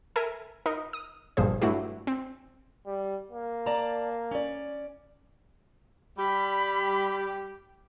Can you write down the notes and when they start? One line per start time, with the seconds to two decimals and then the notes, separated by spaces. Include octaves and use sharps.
0.16 A4 A#4 E5 G#5
0.66 D#4 A#4 D#5
0.93 D#6
1.37 G1 G2 A#2 F3 G#4 C5
1.62 G2 F#3 A3 E4 F#4 G4
2.07 C4
2.86 G3
3.31 A#3
3.66 D5 A5 A#5
4.31 C#4 D5
6.18 G3 G4 B5